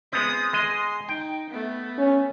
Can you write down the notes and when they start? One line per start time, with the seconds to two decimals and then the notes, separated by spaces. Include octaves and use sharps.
0.13 G#3 B3 C4 D#6
0.53 G#3 D#5 C6
1.09 D#4 G5
1.50 A3 B3
1.98 C#4